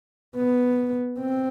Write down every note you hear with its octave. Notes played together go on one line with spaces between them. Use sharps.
B3
C4